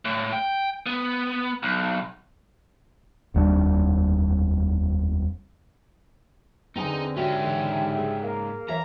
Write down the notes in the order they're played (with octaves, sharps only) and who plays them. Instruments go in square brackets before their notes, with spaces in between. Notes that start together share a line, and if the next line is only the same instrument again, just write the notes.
[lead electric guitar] A2
G5
B3
B1
[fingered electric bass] F1 D#2 G3 D4
[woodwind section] E2 [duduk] D3 [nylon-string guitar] C4 G5 G#5 [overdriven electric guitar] D#4 D#5
[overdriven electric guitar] G#2 C#4 [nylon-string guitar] F#4 [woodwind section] G4 E5
[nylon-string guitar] E3
G#4
[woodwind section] A#3
[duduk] E3 [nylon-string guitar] C#5 E5 F5 [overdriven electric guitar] A#5